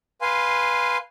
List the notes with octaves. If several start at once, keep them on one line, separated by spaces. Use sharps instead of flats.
B4 F5 G#5 C6